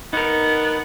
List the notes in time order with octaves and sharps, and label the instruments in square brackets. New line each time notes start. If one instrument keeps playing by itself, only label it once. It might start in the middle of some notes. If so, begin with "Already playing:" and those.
[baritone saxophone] B3 [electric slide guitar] D#4 A#4